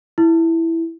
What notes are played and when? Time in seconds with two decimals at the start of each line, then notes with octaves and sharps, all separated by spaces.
0.18 E4